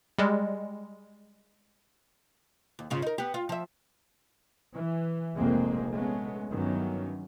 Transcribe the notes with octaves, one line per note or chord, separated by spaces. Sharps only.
G3 G#3
D#2
G#2 C#3 F4
D#4 A#4
B3 G4
F4
F3 E5
E3
F1 A#1 F2 G#3 A#3 C4
G#3 A3 B3 C#4
G2 D#3 E3 F#3 B3 C#4